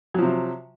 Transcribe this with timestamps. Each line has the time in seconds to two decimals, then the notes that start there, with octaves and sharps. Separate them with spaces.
0.14 F#3
0.18 F3
0.22 C3